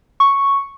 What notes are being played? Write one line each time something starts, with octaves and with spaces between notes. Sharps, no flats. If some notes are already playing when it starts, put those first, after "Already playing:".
C#6